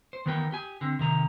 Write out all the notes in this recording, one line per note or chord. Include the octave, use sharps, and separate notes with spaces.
C5
D#3 E3 B3 A#4 G5
G4 G#5
D3 C4
C3 D#3 A#5